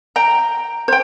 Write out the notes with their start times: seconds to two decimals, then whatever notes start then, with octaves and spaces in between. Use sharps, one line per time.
0.16 G5 A#5
0.88 C5 G5